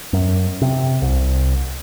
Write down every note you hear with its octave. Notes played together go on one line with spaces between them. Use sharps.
F#2
C3
C2